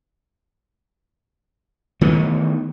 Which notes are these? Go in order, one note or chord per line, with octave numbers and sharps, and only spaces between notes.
D#3 E3 A3 B3